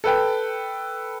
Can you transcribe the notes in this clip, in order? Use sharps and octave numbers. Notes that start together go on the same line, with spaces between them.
A4 B4 G5